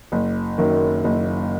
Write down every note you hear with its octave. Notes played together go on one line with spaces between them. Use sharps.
F#1
F#2 D#3 A#3
F#1